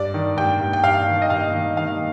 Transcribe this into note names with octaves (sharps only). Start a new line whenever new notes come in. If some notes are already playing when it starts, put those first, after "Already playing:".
Already playing: G2 D5
D#3
G2 G5
G2
G5
G2 F5
D#3
D#5
G2 F5
D#3
D#3 F5